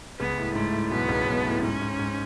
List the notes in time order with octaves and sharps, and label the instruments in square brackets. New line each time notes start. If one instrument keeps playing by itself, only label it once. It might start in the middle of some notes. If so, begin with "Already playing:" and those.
[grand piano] C#2 C#3 [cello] B3
[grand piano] A2
[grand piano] G#2 [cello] A3
[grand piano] A2
[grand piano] B1 B2 [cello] B3
[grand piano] C#2 C#3
B1 B2
A2
[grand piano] G#2 [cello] C#4
[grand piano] G#2
G#2